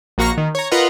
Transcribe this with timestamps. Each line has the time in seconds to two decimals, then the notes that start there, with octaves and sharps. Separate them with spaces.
0.18 A#1 A#3 F#4 A#5 C#6 A#6
0.37 D#3
0.55 C#5 A#5
0.71 F4 A#4 B4 D#5 F#5